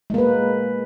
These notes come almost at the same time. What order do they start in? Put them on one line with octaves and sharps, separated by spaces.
G#3 A#3 B4